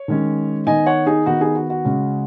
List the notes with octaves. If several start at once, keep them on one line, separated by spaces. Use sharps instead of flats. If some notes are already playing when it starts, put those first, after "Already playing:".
Already playing: C#5
D#3 G#3 C#4
D#3 B3 D#4 D#5 G#5
C#5 F#5
D#4 G#4
D#3 B3 D#4 F#4
D#4 G#4
F#4
F#4
C#3 G#3 C#4